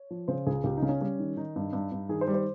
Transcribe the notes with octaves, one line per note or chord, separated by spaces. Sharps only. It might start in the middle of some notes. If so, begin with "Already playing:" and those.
Already playing: C#5
F3
C#3 C5
C#2 G#4
C#2 G4
D#4
C#3
C#4
G3 C#4
D#3
D#3 D#4
G2
G2
G2
D#3 G#4
C5
G3
C5